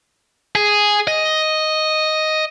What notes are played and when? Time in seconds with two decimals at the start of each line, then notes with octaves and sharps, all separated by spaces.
0.55 G#4
1.07 D#5